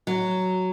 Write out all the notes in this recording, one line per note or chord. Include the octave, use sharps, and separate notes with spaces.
F#3